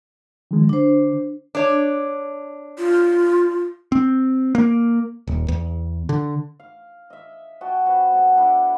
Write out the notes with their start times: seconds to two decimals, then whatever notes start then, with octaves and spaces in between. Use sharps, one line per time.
0.51 D#3 F3 G#3
0.69 D3 D4 C5
1.55 D4 C#5
2.78 F4
3.92 C4
4.55 A#3
5.27 D#1
5.48 E2
6.09 D3
6.60 F5
7.10 D#5 E5
7.61 F#4 D#5 G5 A5
7.85 C4 F#4 B4
8.11 B3 A4
8.37 D4 E4